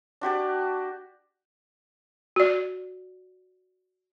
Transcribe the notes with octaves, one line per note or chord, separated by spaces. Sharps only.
D4 F#4 G4 D5
F#4 D5